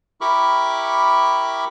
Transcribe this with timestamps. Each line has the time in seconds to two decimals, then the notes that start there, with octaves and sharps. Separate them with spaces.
0.21 E4 G4 A#4 B5 C#6 D6